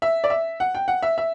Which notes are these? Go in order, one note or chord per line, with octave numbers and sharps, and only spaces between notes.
E5
D5
E5
F#5
G5
F#5
E5
E5